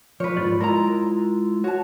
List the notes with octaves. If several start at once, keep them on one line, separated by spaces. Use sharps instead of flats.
F3 B4 C#5
G#2 F4 D5
G#3 E4 F4 A#4 A#5
F#4 C#5 A5